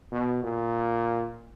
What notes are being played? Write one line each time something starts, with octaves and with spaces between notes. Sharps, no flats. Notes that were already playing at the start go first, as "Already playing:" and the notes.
B2
A#2